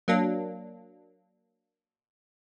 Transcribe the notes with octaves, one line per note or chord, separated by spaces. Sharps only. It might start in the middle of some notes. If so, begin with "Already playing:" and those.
F#3 A#3 D4